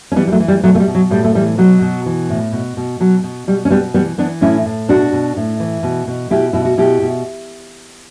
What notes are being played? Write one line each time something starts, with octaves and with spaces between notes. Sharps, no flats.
C#4
E3 G3 B3
G3
F#3 A3
E3
G3
B2 F#3 A3
A3
G3
B2
F#3
A2 G3
A3
E3 G3
B2 F#3
B2
E3
A2
B2
B2
B2 F#3
B2
B2 G3
C#4
B2 G3 B3
E3 G3 B3
E3 B3 D4
A2 C#4 E4
A2
B2 D4 F#4
B2
A2
E3
B2
B2
B2 E4 G4
B2 E4
F#4
B2 E4 G4
B2